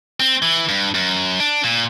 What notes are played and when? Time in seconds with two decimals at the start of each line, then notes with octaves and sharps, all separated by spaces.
0.20 C4
0.42 E3
0.69 G2
0.95 F#2
1.40 D4
1.64 A#2